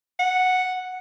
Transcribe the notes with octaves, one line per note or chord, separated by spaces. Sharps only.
F#5